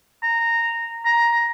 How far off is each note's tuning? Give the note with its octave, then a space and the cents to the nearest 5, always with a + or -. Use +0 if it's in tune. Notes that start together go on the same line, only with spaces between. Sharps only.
A#5 -10
A#5 +10